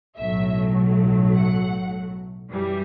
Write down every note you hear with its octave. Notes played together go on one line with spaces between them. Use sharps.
B1 A2 F#3 A3 E5
F#5
F#2 E3 G3